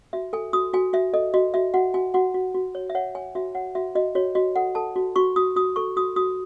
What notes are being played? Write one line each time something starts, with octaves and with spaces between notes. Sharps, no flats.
F#4 E5
A4 G#5
F#4 D#6
F#4 G#5
F#4 E5
A4 D#5
F#4 D#5
F#4 E5
F#4 F#5
F#4 G#5
F#4 F#5
F#4
F#4
C#5
E5
C#5 F#5
C#5 G#5
F#4 E5
C#5 F#5
F#4 E5
F#4 D#5
F#4 C#5
F#4 D#5
A4 F#5
A4 A5
F#4
F#4 C#6
F#4 D#6
F#4 D#6
A4 C#6
F#4 D#6
F#4 D#6